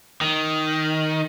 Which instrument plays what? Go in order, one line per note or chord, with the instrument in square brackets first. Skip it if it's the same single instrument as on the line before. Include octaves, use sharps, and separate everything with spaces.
[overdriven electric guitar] D#3